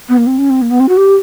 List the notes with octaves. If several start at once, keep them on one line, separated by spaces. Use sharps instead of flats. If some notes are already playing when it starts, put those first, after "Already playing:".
B3
A#3
C4
C#4
C4
A#3
B3
C4
F#4
G4